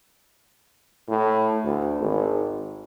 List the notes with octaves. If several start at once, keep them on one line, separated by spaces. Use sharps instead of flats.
A2
D2
G#1